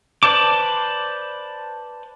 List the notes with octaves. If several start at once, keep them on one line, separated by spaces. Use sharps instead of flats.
B4 C5 D5 A5 D6